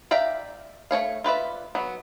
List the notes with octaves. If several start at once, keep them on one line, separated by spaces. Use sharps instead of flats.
D5 E5 F5 G5 A#5
A3 C#4 C#5 F5
F4 B4 D5 E5
F#3 B3